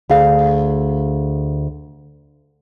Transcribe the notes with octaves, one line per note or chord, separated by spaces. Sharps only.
D2 G#4 F5